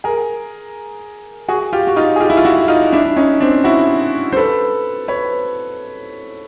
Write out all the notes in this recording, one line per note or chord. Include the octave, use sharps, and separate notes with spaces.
G#4 A#4
F#4 G#4
F4 G4
F#4
D#4 F4
G#4
F4 G4
E4
F4
E4 F#4
D#4 F4
D4 E4
D4
C#4 D#4
C4 D4
E4 F#4
C5
A4 B4
B4 C#5